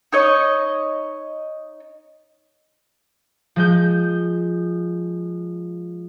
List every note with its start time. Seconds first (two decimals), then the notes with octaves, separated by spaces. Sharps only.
0.12 D#4 C#5 D#5
3.56 F3 G#3 G6